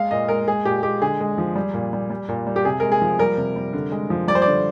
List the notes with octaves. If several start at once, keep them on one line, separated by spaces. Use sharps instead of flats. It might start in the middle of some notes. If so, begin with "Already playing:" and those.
Already playing: G#3 F5
A#2 D#5
G#3 A#4
G#3 G#4
A#2 G4
G#3 G4
D3 G#4
G#3
F3
G3
A#2
G3
G3
A#2
G3
G4
C3 G#4
G#3 A#4
G#4
F3
G3 A#4
C3
G3
D3
G#3
F3
G3 D5
C5
D5
D3